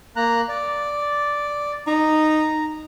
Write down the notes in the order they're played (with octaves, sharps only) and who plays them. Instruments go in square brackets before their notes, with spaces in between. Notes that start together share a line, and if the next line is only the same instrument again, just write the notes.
[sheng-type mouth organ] A#3 A#5 F#6
D5
[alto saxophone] D#4 [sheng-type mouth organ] A#5